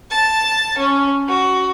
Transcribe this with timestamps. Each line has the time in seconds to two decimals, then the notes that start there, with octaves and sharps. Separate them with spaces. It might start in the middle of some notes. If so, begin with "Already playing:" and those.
0.11 A5
0.78 C#4
1.28 F#4